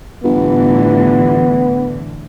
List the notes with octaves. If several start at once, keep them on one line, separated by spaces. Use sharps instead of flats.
G1 A2 D3 E3 B3